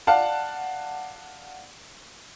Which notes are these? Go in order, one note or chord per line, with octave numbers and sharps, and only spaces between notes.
D5 F5 F#5 A5